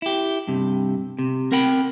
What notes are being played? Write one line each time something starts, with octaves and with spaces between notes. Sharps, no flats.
E4 G4
G2 C3
C3
C4 A#4 F#5 G5 B5